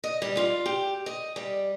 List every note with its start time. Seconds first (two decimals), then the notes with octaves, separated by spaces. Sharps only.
0.04 D#5
0.22 G3
0.37 F4
0.66 G4
1.06 D#5
1.36 G3